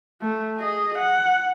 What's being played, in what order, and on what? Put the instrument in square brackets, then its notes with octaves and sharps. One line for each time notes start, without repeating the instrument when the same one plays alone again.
[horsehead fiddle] A3
G#4 D#5
F#5